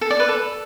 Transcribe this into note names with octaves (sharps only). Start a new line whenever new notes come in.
A4
D5
B4
A4